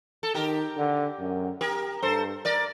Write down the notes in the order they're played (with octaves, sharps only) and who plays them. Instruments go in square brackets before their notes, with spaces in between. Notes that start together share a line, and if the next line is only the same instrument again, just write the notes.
[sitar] A4
[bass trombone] D#3 [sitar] G4 A#4
[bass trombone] D3
F#2
[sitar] G4 A#4
[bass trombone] G2 [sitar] A4 C5
[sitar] A#4 D5